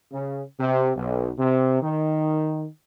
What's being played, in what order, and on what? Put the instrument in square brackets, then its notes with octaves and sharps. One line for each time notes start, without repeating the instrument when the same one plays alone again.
[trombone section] C#3
C3
B1
C3
D#3